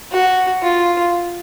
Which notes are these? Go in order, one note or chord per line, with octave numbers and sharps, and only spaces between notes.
F#4
F4